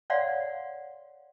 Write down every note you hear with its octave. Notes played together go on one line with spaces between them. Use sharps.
C#5 D5 F5 F#5 C6